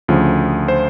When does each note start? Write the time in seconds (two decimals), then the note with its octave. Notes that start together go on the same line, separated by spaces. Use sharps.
0.08 D2 C#3 F3
0.68 C5